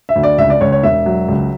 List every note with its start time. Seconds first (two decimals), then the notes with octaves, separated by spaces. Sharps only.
0.09 E5
0.16 D2
0.23 D5
0.38 C#2 E5
0.50 D5
0.61 C#2 C#5
0.72 C#5
0.83 E1 E5
1.06 F#3
1.29 C#2